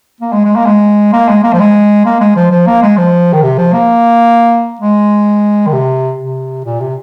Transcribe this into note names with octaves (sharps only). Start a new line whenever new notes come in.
A#3
G#3
G#3
A#3
G#3
A#3
G#3
A#3
F3
G#3
A#3
G#3
F3
F3
A#3
G#3
F3
D#3
C3
F3
A#3
G#3
D#3
C3
C3
A#2
C3